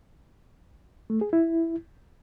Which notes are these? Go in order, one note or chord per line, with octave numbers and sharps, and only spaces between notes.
A3
G#4
E4